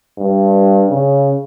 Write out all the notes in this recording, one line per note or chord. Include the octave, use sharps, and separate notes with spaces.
G2
C#3